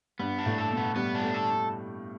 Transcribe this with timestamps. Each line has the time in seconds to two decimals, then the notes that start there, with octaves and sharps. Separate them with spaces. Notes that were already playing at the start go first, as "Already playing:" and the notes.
0.19 G2 B3
0.39 D4
0.46 A2
0.58 A4
0.71 B2
0.77 B3
0.96 G3 B3
1.15 D4
1.22 A3
1.34 A4